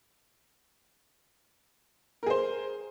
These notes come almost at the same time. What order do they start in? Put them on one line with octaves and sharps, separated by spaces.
A#4 G#4 C5